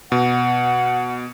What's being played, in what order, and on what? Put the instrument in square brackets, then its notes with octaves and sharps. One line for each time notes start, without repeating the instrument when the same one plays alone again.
[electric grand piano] B2 [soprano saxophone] F#5